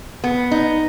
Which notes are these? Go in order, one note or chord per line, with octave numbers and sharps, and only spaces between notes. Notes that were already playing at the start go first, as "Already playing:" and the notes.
B3
D#4